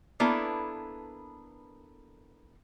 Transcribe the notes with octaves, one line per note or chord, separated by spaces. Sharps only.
A#3 B3 D4 E4 A4 B4